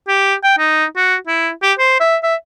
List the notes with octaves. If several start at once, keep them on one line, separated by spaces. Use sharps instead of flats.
G4
G5
D#4
F#4
E4
G4
C5
E5
E5